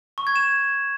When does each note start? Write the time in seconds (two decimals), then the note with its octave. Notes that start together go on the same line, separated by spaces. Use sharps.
0.18 C#6
0.27 G#6
0.36 E7